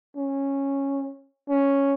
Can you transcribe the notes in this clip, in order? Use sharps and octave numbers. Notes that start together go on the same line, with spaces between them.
C#4
C#4